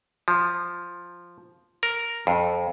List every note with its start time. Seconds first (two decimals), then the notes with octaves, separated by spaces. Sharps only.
0.28 F3
1.83 A#4
2.27 F2